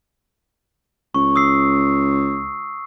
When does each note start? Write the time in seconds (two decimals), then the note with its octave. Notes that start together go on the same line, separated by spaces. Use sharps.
1.15 C#2 C#6
1.36 D#6 E6 C7